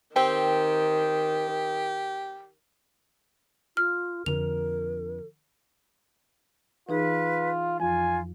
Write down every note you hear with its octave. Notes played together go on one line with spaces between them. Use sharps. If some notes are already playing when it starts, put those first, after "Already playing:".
D#3 C4 G4
F4 F6
F2 D3 A#4 F7
E3 D#4 F4 G#4 B4
F2 F3 F4 G#5